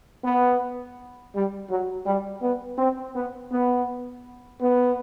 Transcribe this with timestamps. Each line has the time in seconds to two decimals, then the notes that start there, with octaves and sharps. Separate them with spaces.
0.24 B3
1.34 G3
1.70 F#3
2.06 G3
2.42 B3
2.78 C4
3.15 B3
3.51 B3
4.60 B3